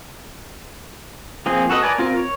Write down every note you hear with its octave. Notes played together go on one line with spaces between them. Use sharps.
F3 A#3 C4 G#4
F#4 A4 B4 D#5
A#4 B4 D5 G#5
C4 F4 A#4
C#5